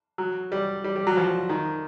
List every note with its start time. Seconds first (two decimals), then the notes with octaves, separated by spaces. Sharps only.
0.18 F#3
0.52 G3
0.84 G3
0.96 G3
1.07 F#3
1.17 F3
1.49 D#3